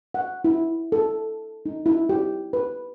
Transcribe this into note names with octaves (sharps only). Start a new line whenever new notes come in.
F#5
E4
A4
D#4
E4
G4
B4